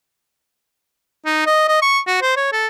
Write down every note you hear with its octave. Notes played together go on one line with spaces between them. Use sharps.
D#4
D#5
D#5
C#6
F#4
C5
C#5
A4